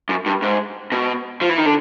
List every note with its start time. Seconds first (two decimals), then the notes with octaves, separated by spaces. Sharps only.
0.09 F#2
0.26 G2
0.42 G#2
0.92 B2
1.41 F3
1.49 E3
1.58 D#3
1.65 D3